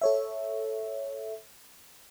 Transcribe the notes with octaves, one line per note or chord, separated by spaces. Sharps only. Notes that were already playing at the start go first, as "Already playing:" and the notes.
A4 C#5 E5